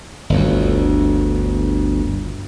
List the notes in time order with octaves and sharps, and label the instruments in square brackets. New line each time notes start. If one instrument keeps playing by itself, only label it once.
[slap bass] G1 D2